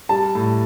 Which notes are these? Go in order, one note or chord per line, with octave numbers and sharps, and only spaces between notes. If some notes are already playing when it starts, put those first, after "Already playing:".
G3 A5
A2